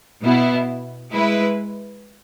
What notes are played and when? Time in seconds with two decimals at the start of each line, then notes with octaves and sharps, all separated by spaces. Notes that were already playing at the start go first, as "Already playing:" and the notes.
0.22 B2 B3 E4
1.11 G#3 E4 B4